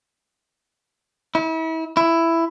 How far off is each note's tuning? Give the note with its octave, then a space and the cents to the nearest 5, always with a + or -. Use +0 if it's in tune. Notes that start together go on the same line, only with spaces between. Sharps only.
E4 -35
E4 +10